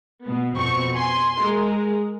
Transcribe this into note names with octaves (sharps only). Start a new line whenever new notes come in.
B2 B3
F2 B2 C4 C#6
G#5 C6
G#3 A#4